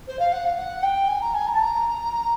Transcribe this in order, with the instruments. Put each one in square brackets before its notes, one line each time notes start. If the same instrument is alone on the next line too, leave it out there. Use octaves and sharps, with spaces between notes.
[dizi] C5
F5
F#5
F5
F#5
G5
G#5
A#5
G#5
A#5
A5
A#5